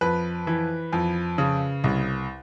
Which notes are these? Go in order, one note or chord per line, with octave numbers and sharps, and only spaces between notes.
F2 B4
E3
F2
C#3
C2